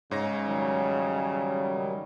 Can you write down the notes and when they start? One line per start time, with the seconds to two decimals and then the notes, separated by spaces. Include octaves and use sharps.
0.11 G#2 C#3 C#5 A#6
0.45 D#3 F#3 G3